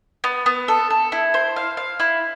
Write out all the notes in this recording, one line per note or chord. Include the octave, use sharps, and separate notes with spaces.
B3
B3
A4
A4
E4
C5
F5
F5
E4